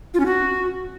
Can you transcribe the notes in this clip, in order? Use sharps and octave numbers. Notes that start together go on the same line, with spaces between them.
F4
C#4
F#4